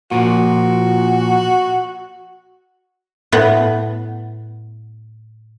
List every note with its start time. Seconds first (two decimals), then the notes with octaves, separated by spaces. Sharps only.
0.11 A#2 F3 F#4
3.32 A2 B3